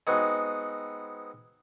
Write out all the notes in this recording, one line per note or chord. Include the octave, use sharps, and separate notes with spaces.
G#3 B3 C4 D#4 F#4